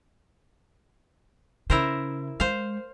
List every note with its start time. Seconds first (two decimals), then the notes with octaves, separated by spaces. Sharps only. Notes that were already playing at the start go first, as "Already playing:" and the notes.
1.70 C#3 E4 A#4 C5
2.40 G#3 C5 F5